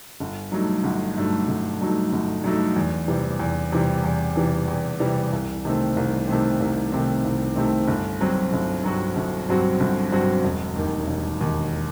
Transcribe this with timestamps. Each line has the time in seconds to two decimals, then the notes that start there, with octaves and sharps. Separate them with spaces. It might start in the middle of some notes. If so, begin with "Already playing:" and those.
0.20 G1
0.52 G2 F#3 A3 D#4
0.84 G1
1.17 G2 F#3 A3 D#4
1.48 G1
1.81 G2 F#3 A3 D#4
2.13 G1
2.44 G2 F#3 A3 D#4
2.76 E2
3.08 C3 E3 G3
3.40 E2
3.72 C3 E3 G3
4.04 E2
4.36 C3 E3 G3
4.68 E2
5.00 C3 E3 G3
5.33 C2
5.65 C3 D#3 A3 C4
5.97 C2
6.28 C3 D#3 A3 C4
6.60 C2
6.92 C3 D#3 A3 C4
7.24 C2
7.56 C3 D#3 A3 C4
7.88 G1
8.20 G2 F#3 C4 F#4
8.53 G1
8.84 G2 F#3 C4 F#4
9.16 G1
9.49 G2 F#3 C4 F#4
9.80 G1
10.12 G2 F#3 C4 F#4
10.44 E1
10.76 D#2 D#3
11.08 E1
11.41 D#2 D#3